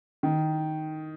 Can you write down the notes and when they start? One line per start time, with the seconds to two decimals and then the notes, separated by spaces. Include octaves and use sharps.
0.23 D#3